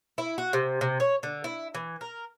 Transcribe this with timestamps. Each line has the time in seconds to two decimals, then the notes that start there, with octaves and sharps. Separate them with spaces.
0.18 E4
0.38 F#4
0.53 C3
0.81 C3
1.00 C#5
1.23 D3
1.44 E4
1.74 E3
2.01 A#4